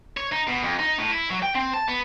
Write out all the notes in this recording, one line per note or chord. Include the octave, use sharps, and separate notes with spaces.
C#5
D#4
B2
F2
D#4
A2
E4
F#3
G5
C4
A5
B3